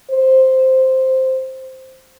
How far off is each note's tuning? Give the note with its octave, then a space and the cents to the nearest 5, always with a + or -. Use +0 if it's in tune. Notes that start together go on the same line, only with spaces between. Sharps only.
C5 +0